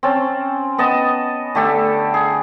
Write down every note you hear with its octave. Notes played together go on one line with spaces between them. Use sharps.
C4 C#4 A5
B3 D#5 A5
D3 A3 G4 A4
G#4